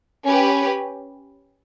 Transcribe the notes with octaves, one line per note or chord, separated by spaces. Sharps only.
C#4 G4 B4